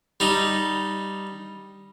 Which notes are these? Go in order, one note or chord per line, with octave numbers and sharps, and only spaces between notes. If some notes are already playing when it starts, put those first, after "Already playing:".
G3 D#4